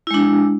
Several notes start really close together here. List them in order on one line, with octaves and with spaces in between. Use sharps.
E4 G#3 D4